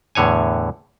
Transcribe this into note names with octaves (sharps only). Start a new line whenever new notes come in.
E2 A2 D3 C#5 G#5